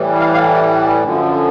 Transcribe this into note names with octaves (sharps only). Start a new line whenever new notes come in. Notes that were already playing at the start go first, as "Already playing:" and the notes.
Already playing: A2 E3 G3
F5
F5
F#2 D3 F3